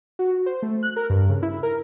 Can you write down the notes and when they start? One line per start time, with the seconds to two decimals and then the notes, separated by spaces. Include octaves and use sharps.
0.19 F#4
0.46 C5
0.62 A3
0.83 F#6
0.96 A#4
1.10 G2
1.29 C#3
1.43 E4
1.63 A#4